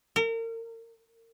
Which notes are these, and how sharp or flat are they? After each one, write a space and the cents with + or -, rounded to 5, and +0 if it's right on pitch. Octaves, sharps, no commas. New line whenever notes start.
A#4 -35